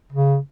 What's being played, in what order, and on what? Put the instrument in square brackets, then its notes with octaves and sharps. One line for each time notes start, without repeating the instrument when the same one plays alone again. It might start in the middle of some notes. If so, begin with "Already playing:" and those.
[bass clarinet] C#3